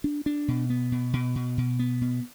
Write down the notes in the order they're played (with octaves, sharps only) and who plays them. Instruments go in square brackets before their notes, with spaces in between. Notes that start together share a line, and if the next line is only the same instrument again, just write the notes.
[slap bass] D4
D4
B2
B3
B2
B2
B2
B2
B3
B2